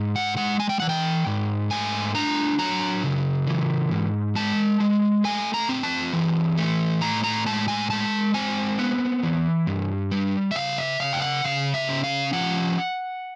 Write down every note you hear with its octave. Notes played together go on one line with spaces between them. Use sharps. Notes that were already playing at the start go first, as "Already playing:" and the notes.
Already playing: G#2
F#5
G#3 F#5
G#5
G5
E3 F#5
G5
G#2
A3 G#5
D4 A#5
F#3 A#5
C#3
E3
G#2
G#3 A5
G#3
A3 G#5
A#5
C4
A5
E3
A3
A2 A#5
A#5
G#3 A5
G#5
G#3 A5
C4 G#5
B3
E3
G2
G3
E5
C#3 F5
E5
C#3 F5
G5
F#5
C#3 F5
E5
C#4
F5
F3 F#5